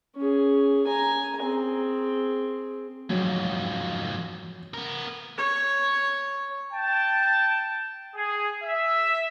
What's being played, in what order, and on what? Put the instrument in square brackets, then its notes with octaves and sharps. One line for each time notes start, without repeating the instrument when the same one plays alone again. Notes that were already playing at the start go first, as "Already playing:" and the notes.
[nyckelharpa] C#4 G#4
G#5 A#5
C4 G#4
[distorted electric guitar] F2 G#2 [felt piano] F#3
[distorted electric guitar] B3 A#4
[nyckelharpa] C#5
[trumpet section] G5 A5
G#4
E5